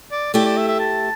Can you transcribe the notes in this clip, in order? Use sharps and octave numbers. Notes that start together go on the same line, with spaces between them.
D5
A3 E4 G4 D5
D5
E5
E5
A5